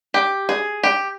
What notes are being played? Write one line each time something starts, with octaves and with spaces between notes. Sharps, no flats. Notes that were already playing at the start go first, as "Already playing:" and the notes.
G4
G#4
G4